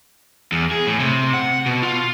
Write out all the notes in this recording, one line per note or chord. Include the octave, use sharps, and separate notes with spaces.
E2
G#4
A2
C3
F#5
B2
F4